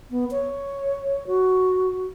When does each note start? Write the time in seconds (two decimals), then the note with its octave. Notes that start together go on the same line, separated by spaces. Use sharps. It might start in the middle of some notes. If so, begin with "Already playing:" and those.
0.10 B3
0.31 C#5
1.27 F#4